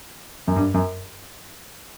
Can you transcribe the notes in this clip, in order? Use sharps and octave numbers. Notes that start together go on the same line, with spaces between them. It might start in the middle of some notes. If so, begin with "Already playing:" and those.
F#2
G2
F#2